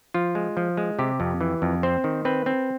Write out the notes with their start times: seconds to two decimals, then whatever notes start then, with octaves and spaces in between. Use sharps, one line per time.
0.14 F3 F4
0.35 G#3
0.57 F3
0.77 G#3
0.99 C3 G4
1.20 F2
1.41 E3
1.62 F2
1.83 C4 C5
2.04 D#3
2.25 C4 B4
2.46 C4